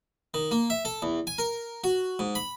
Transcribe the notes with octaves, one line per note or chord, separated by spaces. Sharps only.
D#3
A#3
E5
A4
E2
G#5
A#4
F#4
G#2
B5